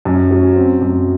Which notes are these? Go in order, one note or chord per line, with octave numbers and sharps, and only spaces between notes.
F#2
F#3
C4
F#2